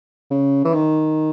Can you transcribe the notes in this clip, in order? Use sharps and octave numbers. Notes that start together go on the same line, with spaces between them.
C#3
E3
D#3